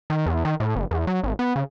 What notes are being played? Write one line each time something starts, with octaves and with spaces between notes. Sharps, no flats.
D#3
E2
D#3
A2
F#1
E2
F#3
G#1
B3
C#3